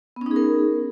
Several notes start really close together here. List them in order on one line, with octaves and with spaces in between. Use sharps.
B3 C#4 D#4 G#4 A#4